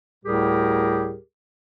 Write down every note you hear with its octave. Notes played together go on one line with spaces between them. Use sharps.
D2 A2 G3 G4 G#4 A#4